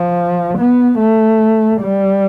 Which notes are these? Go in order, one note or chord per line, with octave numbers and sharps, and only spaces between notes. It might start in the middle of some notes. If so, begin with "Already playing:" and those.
Already playing: F3
B3
A3
G3